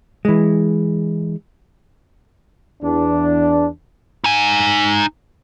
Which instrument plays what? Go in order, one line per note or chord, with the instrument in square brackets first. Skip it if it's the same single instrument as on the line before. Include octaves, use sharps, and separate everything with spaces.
[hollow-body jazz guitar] E3 G#3
[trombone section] E2 D4
[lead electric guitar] D#4 G#5